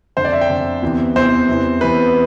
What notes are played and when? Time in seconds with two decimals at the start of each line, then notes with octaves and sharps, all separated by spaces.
0.17 F2 D3 C5
0.25 D5
0.33 E5
0.41 G5
0.50 F2 D3
0.82 E2 C3 E3
1.16 E2 C3 E3 C5
1.48 E2 C3 E3
1.81 E2 C3 E3 B4